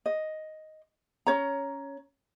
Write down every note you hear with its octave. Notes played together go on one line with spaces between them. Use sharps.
D#5
C#4 C#5 A#5